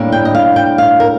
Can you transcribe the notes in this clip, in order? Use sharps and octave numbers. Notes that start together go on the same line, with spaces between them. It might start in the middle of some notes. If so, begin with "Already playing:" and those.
Already playing: A2 G3 A#3 D4
G5
D#5
F5
G5
F5
A#4